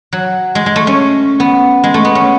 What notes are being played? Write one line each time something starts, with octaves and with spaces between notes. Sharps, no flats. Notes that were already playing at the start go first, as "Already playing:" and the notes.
F#3
G#3
G#3
A3
C#4
B3
G#3
A3
B3
C#4